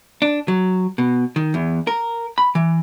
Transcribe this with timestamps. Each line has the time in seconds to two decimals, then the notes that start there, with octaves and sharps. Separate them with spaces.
0.22 D4
0.48 F#3
0.98 B2
1.36 D#3
1.54 E2
1.87 A#4
2.38 B5
2.55 E3